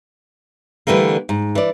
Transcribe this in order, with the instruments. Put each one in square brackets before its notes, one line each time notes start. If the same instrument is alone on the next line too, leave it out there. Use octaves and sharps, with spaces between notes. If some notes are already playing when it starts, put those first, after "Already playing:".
[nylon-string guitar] D3 E3 G3 A3 A#3
G#2
E3 D5